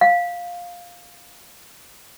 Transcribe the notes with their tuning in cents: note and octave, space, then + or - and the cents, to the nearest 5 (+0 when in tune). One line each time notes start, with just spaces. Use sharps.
F5 +10